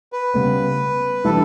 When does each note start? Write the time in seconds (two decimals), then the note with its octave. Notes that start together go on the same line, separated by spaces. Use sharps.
0.13 B4
0.34 C#3 G3 B3
1.25 E3 G3 D4 A4